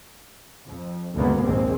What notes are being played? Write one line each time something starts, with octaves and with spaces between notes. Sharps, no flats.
F2
D2 G2 C#3 G#3 A#3 B3
A#1 D#2 G#2 G#3 C4